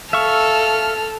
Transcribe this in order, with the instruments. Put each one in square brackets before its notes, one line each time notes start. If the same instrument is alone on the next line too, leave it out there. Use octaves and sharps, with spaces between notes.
[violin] A4 F6 [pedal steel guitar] E5 F5 C#6